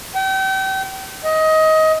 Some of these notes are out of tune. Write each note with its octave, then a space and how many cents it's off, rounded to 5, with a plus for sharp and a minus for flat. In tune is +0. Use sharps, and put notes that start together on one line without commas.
G5 -35
D#5 +20